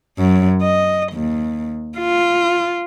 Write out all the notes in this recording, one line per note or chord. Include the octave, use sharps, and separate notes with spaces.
F#2
D#5
D#2
F4